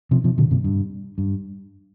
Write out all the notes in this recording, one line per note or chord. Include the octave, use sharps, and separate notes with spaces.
C3 F3
C3 F3
A#2 D3
G2 C3
G2
G2